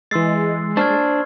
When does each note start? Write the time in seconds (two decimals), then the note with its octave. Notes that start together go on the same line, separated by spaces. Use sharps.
0.11 E3 G#3 C6 E6 A6 C7
0.77 D4 C5 A5 C#6 F6 G#6